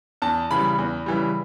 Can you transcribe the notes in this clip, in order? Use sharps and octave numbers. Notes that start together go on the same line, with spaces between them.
E2 A5
C#3 E3 G3 B5
E2
C#3 E3 G3